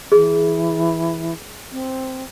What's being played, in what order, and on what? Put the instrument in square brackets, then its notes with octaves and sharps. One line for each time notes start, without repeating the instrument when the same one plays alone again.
[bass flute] E3 [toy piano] G#4
[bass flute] C4